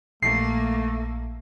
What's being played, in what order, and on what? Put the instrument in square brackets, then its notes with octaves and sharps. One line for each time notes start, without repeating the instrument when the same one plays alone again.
[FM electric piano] A#1 [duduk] A3 [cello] A#3 [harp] C7